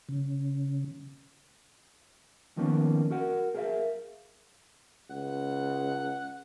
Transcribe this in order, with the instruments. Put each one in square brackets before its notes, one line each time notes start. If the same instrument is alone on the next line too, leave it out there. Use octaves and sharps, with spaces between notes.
[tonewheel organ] C#3
[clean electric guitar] D#3 F3 A#3 B3 C#4
F#4 A#4 F#5
G#4 A#4 B4 E5 F5
[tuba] C#2 [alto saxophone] F#5